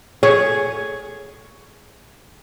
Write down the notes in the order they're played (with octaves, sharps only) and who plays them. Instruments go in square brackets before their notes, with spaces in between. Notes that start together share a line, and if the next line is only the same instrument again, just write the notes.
[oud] G#4 [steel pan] C#5